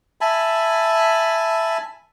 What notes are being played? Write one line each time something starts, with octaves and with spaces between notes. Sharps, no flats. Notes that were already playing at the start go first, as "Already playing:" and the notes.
E5 G#5 A5 B5